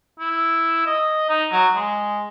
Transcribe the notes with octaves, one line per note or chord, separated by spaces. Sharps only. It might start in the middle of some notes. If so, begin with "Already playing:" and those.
E4
D#5
D#4
F#3
G#3